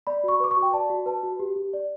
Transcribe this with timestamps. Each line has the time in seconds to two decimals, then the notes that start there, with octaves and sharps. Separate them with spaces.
0.07 D5 B5
0.24 F#4 C#6
0.40 B4 D6
0.51 C#6
0.57 F#4
0.62 G5
0.73 D5 A5
0.90 F#4
1.06 B4 A5
1.23 F#4
1.39 G4
1.56 G4
1.73 D5